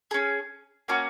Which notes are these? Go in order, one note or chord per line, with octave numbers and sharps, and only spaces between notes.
C#4 G#4
A#3 C#4 F#4